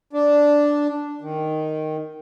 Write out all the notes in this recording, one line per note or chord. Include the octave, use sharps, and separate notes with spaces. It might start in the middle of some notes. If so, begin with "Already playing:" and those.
D4
D#3